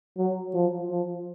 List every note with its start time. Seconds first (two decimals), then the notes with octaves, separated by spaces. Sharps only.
0.17 F#3
0.54 F3
0.91 F3